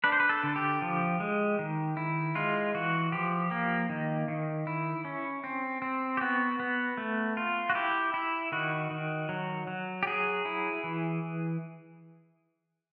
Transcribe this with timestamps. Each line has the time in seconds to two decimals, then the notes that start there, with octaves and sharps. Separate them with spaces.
0.04 D4 B4
0.12 C5
0.20 B4
0.29 A4
0.43 D3
0.56 G4
0.82 F3
1.20 G#3
1.59 D#3
1.97 E4
2.35 G#3 F4
2.75 E3 F#4
3.12 F3 G4
3.51 A#3
3.89 D#3
4.28 D#3
4.67 E4
5.05 C#4
5.44 C4
5.82 C4
6.17 G4
6.21 B3 F#4
6.60 B3
6.97 A3
7.37 F4
7.70 F#4
7.75 E4 G4
8.14 E4
8.52 D#3 F#4
8.91 D#3
9.29 F#3
9.67 F#3
10.03 G4
10.07 F#3 G#4
10.45 E4
10.84 E3